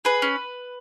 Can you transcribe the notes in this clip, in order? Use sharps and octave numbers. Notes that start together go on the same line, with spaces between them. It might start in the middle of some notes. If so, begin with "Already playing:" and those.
G#4 B4
C#4